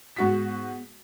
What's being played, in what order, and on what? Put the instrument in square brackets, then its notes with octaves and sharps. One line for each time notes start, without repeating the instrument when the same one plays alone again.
[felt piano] G#2 F#4 B6 [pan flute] B3